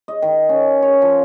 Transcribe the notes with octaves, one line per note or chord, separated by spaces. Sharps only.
D#5
D#3
C#4
C#5
F3